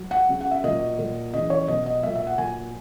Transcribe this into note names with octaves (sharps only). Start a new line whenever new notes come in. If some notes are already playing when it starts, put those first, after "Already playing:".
Already playing: F#3
F#5
C#3 F#3
F#5
E5
A#2 F#3 D#5
A#2 F#3
C#3 E3 D#5
C#5
B2 F#3 D#5
D#5
A#2 F#3 E5
E5
F#5
A#2 F#3 G#5